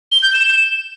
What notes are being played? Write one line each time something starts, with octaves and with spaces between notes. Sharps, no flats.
G7
G6
E7